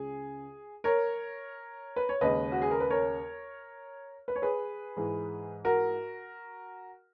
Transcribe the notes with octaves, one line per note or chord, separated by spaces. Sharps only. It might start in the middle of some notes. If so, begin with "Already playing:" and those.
Already playing: C#2 C#3 G#4
A#4 C#5
B4
C#5
D#2 C#3 G#3 B4 D#5
F#4
G#4
A#4
B4
A#4 C#5
B4
C#5
G#4 B4
G#2 E3 G#3
F#4 A#4